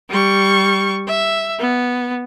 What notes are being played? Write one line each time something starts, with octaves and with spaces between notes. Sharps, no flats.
G3 C#6
E5
B3